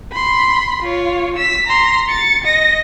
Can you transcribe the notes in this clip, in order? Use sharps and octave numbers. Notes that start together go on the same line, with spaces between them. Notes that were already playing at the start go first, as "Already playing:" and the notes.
B5 C6
F4 C#5
E6 B6
A#5 C6
A6 C#7
D#5 A#6